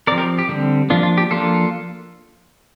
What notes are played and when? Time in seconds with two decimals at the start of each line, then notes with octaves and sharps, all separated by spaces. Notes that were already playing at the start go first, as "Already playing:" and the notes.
0.07 F3 C4 A#4 D5
0.18 G4 A#4
0.39 G4
0.48 D3 G3 C4
0.90 F3 A#3 D4 F4
1.03 F4
1.18 G4
1.31 F3 A#3 D4 F4 A4